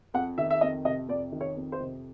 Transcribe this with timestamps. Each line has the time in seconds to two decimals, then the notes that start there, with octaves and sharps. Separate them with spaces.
0.14 F2 F#5
0.38 D#3 E5
0.51 E5
0.61 F2 D#5
0.85 C3 D#5
1.08 F2 D5
1.32 D#3
1.41 C#5
1.57 F2
1.72 C5
1.80 C3